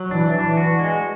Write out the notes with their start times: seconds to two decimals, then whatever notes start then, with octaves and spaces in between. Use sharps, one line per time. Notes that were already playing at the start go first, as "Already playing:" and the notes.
Already playing: F#3
0.11 E3 D4
0.34 D4
0.57 F#4
0.79 G#3